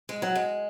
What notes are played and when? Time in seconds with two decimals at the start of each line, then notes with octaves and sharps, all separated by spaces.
0.09 G#3
0.22 F#3
0.35 G#3